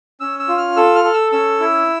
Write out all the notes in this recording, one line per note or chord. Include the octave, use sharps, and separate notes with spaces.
C#4 E6
E6
F4
F6
A4 E6
F6
A4
E6
C#4 E6
E4